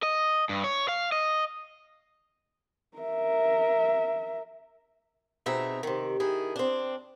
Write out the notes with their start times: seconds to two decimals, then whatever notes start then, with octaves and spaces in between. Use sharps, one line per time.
0.03 D#5
0.49 G2
0.64 C#5
0.88 F5
1.12 D#5
2.97 A#4 E5
5.46 B2 C4 D#4 G#4 E5 A#5
5.83 C3 D#3
6.20 D#3 E4 G#4
6.56 C4 D4